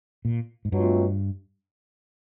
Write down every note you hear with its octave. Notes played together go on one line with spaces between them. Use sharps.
A#2
G#2
G2 B2 F#3 A3 C4 F4